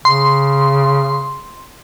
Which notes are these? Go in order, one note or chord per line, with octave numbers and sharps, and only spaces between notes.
C#3 C6